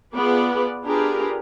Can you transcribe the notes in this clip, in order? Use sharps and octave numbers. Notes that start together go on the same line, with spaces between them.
B3 F4 G#4 B4 D5
D4 F4 G4 G#4 A#4 B4